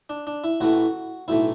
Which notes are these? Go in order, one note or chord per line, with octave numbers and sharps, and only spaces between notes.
D4
D4
E4
A1 A2 E3 A3 F#4
B1 A2 E3 A3 E4